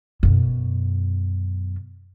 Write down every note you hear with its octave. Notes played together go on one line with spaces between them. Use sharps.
F#2 B2